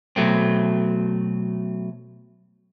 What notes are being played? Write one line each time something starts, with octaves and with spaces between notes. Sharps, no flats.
B2 F#3 A3 C4